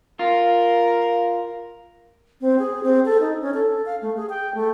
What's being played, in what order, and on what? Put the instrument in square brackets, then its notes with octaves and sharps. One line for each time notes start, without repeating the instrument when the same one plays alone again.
[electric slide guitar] F4 [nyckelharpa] A#4
[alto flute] C4
G#4
C4
A4
D#4
C#4
A4
F5
A3
G#4
G5
A3